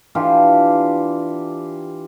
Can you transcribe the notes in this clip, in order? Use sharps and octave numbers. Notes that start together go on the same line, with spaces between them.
E3 D4 F4 G4